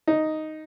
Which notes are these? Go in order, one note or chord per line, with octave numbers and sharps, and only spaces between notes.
D#4